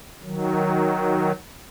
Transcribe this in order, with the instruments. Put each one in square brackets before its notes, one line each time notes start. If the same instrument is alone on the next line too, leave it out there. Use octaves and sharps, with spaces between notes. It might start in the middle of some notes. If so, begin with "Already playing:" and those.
[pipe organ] D#3 F#3